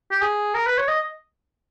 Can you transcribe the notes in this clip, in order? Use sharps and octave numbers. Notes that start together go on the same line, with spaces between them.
G4
G#4
A#4
B4
C#5
D#5